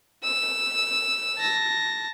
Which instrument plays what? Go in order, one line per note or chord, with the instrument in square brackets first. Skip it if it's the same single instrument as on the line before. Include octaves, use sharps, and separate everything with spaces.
[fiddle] E6
[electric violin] A5 A#6